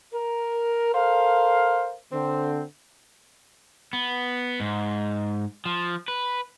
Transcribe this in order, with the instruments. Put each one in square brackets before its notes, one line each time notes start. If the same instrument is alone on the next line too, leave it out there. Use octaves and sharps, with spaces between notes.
[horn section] A#4
A4 A#4 C5 F5
D3 C4
[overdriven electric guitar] B3
G#2
F3
B4